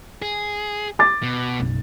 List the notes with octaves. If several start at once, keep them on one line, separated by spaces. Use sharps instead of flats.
G#4
D6 A6
B2
F#1 B1